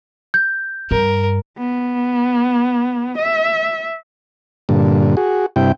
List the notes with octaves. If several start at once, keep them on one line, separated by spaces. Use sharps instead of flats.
G6
G2 A#4
B3
E5
G2 A#2 D3
F#4 G#4
G2 C3 E4 G5